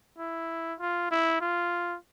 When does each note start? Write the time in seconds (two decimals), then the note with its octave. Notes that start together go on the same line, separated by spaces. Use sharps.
0.19 E4
0.80 F4
1.11 E4
1.41 F4